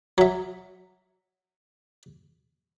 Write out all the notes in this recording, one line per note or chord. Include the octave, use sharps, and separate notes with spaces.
F#3 E5